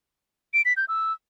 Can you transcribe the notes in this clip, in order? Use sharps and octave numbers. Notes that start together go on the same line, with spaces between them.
D7
B6
G6
E6